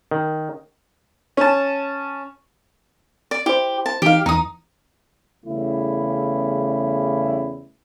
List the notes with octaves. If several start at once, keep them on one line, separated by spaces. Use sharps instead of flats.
D#3
C#4 A5
D5
E4 G4 C5
A5
E3 D#4 G4 F5
E2 E3 D#4 D#6
E2 C#3 G3 A3 E4